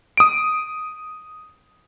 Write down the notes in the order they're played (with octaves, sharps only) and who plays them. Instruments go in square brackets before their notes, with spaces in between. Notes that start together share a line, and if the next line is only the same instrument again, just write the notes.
[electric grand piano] D#6 D7